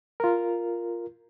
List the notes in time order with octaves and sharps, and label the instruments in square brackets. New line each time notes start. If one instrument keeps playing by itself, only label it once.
[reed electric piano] F4 A#4